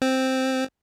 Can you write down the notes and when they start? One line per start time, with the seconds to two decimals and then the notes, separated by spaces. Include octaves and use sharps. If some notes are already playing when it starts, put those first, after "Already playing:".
0.02 C4